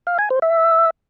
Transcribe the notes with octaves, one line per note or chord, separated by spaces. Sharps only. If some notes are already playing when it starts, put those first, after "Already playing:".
F5
G#5
C5
E5